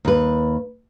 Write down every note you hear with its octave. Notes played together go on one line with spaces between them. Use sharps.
D#2 B4